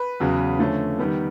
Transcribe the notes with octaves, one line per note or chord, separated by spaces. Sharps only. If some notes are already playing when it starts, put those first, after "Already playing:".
Already playing: B4
E2 C#3 F#3
D3 F3 A3 C#4
D#3 G3 B3